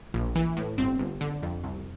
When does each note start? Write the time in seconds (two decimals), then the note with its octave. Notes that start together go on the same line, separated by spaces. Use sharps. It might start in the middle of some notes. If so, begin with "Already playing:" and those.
0.14 A#1
0.35 E3
0.57 A2
0.78 G1 C4
0.99 G1
1.21 D3
1.42 F2
1.64 C2